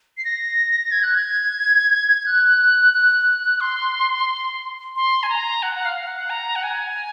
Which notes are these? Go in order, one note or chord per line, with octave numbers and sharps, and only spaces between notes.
C7
A#6
G#6
F#6
G#6
F#6
F#6
C6
C6
G#5
A#5
F#5
F#5
F5
F5
F#5
A#5
F#5
G#5